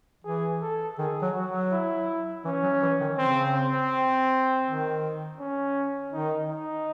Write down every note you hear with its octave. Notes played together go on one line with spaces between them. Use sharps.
E3 G#4
A4
D#3 G#4
F#3
F#4
F#3
E4
E3 C#4
F#3
E3
D#3
C#3 C4
C4
D#3
C#4
D#3 D#4
D#4